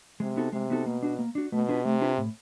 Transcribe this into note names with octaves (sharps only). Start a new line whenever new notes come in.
C3 G#3
B3 D#4 F#4 A4
C3 G#3
B3 D#4 F#4 A4
B2 A#3
D4 F#4
A#3
D4 F#4
B2 A3
D4 F4 G#4 B4
C3 A3
D4 F4 G#4 B4
A2